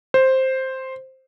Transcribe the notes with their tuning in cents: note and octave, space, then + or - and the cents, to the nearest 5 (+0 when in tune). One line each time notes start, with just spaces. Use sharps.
C5 +5